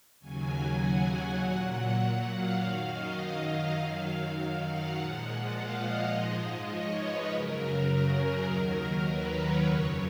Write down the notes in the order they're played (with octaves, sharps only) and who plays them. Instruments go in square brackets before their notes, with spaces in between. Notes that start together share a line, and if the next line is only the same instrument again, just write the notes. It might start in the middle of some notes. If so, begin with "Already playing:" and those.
[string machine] D#2 C#3 F#3 G#5
F#5
F#5
A#2 F#3
F#5
F5
F#2 D#3 F#3
D#5
F#2 D#3 F#3 F5
F#5
A#2 F3 G#3
F5
D#5
G#2 F3 G#3
C#5
B4
F#2 C#3 F#3 A#4
G#4
D#2 D#3 F#3 A#4
B4
C#5
F2 C#3 F#3